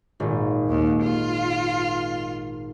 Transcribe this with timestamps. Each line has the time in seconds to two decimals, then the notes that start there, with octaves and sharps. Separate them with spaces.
0.20 G#1 A#2
0.69 D#2
1.04 F4